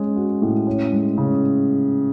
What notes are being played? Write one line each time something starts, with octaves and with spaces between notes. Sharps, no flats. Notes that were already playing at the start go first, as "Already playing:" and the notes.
Already playing: G#3 C#4
F#4
A2
C#4
G#3
C#3